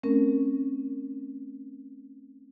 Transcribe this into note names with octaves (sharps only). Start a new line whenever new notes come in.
A3 C4 C#4 A#4